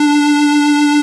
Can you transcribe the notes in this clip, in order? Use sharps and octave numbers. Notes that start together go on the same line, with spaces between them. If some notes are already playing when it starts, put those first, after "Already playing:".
Already playing: D4